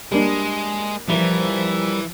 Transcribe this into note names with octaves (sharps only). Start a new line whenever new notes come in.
G3 G#3 A#3 D4
E3 F3 G3 E4 A#4